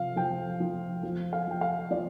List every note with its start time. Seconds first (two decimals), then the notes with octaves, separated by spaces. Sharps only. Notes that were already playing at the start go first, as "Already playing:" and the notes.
Already playing: C3 F3 F5
0.16 F3 G5
0.60 F3
1.03 F3
1.33 F5
1.47 F3 G5
1.61 F5
1.91 F3 D5